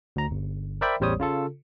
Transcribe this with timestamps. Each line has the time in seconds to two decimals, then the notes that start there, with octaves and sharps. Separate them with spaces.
0.16 D2 A#5
0.31 G1
0.81 A#4 C5 D5 E5 G5 B5
1.00 A1 E2 G3 C5 C#5 D#6
1.19 C#3 F4 A4